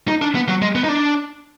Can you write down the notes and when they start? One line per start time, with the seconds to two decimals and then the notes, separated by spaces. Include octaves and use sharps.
0.08 D#4
0.22 D4
0.35 B3
0.48 F#3
0.62 G#3
0.75 B3
0.84 D#4
0.89 D4